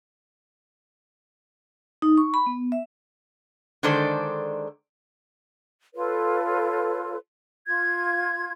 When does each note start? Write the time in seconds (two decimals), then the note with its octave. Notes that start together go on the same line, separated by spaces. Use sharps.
2.02 D#4
2.18 C#6
2.34 B5
2.46 B3
2.72 E5
3.83 D3 D#3 G#3 A4 C5 D5
5.95 F4 A4 B4 C#5
7.67 F4 G#6